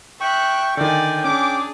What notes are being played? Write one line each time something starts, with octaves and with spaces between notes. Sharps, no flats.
E5 G5 C#6 F#6
D3 D#3 D5 G5 G#5
C#4 D4 G#4 D6